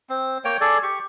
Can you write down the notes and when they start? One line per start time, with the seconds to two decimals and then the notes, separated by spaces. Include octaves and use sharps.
0.09 C4
0.45 A#3 C#5 G5
0.61 G#4 A4 D5
0.83 G4 C#6